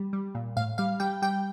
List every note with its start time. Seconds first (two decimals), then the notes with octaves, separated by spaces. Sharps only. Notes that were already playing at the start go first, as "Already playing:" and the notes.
Already playing: G3
0.13 G3
0.35 A#2
0.57 A2 F5
0.78 G3 F5
1.00 G3 G5
1.22 G3 G5